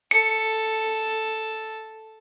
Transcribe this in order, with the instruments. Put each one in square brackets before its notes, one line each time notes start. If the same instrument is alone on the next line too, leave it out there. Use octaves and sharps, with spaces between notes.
[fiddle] A4 [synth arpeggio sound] C#7